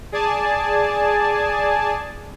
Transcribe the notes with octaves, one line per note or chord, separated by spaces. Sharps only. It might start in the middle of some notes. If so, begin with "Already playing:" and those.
G#4 D5 G#5 A5